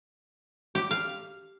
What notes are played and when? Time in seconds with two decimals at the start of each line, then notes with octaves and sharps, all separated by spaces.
0.75 G4
0.91 F5